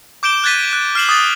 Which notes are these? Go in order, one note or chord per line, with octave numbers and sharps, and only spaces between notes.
D6 G6 D7 E7 G7
F#6 G#6 A6 B6 D#7
F#6
F6 C7 E7 F#7
D#6 A6